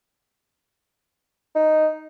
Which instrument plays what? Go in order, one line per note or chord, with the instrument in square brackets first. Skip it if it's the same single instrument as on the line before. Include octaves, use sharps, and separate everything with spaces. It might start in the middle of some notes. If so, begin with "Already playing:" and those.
[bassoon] D#4